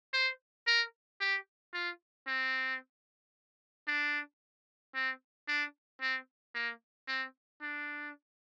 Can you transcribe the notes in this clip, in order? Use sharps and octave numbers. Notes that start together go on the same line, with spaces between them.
C5
A#4
G4
F4
C4
D4
C4
D4
C4
A#3
C4
D4